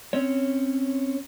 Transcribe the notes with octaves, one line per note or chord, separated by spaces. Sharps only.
C4 C#4 C#5